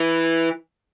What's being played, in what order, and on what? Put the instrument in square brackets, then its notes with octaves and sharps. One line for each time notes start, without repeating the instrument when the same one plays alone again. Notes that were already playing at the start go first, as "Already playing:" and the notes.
Already playing: [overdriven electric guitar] E3